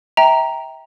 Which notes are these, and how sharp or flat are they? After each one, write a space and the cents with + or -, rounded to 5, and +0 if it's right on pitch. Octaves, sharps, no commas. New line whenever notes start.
E5 -30 G5 +0 A#5 +0